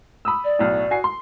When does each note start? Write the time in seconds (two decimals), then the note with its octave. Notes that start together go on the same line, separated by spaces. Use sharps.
0.25 B5 D#6 E6
0.44 D5
0.59 B1 A2
0.91 F#4 G#5 C7
1.04 C6